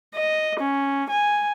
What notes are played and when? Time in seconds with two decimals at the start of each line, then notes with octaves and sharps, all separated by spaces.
0.14 D#5
0.59 C#4
1.10 G#5